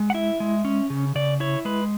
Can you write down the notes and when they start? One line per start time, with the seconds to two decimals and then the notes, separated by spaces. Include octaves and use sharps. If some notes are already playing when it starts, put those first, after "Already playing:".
Already playing: G#3
0.10 F#5
0.14 E4 E5
0.40 G#3
0.65 C#4
0.90 C#3
1.15 C#3 D5
1.40 E4 C#5
1.65 G#3 B4